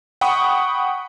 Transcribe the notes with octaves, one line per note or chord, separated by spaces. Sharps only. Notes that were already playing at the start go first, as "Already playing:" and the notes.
F#5 G5 B5 C#6 D#6